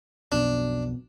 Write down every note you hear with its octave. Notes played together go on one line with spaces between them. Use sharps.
B1 F2 B2 D4